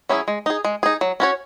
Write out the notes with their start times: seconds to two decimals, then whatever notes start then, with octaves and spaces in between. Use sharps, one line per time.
0.09 F#3 C#4 E4 G#4
0.28 G#3
0.46 D#4 G#4
0.65 G#3
0.83 D#4 G#4
1.01 F#3
1.20 C#4 F#4 C#5